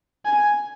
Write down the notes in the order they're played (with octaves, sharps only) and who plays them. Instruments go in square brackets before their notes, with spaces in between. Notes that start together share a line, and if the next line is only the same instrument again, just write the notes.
[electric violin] G#5